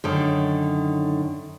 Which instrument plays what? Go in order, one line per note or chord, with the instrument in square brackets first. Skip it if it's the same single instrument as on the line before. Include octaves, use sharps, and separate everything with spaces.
[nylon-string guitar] F#2 D3 D#3